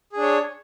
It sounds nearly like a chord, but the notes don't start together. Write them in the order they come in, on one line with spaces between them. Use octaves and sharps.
G#4 D4 C#5